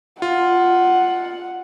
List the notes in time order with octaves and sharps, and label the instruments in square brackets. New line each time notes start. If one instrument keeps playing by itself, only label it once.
[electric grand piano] F4 [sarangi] F#5